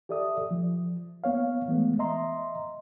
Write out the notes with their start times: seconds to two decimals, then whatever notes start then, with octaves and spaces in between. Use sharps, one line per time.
0.09 G4 A4 D5 E5 D#6
0.51 F3
1.24 A#3 B3 C#5 F5
1.67 E3 G#3 A3 B3
1.99 D#5 E5 A#5 C6